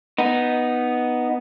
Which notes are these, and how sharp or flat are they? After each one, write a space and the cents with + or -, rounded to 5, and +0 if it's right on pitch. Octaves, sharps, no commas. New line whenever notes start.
B3 +0 D#4 +0